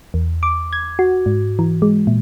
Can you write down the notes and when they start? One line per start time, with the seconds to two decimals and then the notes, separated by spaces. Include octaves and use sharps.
0.14 E2
0.43 D6
0.73 G#6
0.99 F#4
1.26 G#2
1.59 E3
1.82 G#3
2.07 A#2